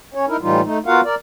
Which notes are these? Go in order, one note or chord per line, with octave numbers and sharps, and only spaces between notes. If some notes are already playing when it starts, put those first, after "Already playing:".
C#4 C#5
D#4 E4 A#4
A2 E3 G3 D#4 F4
A3 D#4
B3 F4 F#4 A#4 F5 F#5
A#4 D5